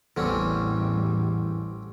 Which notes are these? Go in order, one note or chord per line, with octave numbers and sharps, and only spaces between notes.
A1 E2 D3 G3 C4 C#4